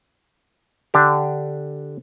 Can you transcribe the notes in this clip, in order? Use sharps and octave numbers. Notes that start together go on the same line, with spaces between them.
D3 D4 G4